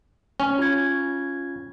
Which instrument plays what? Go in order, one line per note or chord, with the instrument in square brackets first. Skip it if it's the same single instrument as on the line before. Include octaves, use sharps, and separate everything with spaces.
[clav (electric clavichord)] C#4
[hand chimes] F4 G#6